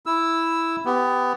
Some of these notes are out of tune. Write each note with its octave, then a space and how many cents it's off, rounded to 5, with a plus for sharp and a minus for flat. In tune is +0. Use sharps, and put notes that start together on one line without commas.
E4 +0 E6 +0
B3 +20 G4 +0